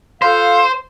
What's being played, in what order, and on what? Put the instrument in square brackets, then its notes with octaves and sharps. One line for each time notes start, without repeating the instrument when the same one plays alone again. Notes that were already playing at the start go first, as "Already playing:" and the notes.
[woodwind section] F4 A4 F5 [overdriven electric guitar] C5